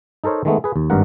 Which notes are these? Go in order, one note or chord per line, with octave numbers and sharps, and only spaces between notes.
D#4 A4 A#4 C5 C#5
D#3 G#3 A3 B3
G#4 B4
D#2
G#1 G2 A#4 F#5